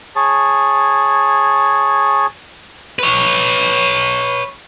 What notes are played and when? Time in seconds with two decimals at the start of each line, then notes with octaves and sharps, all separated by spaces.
0.16 G#4 C#5 A5
2.99 B4 C#5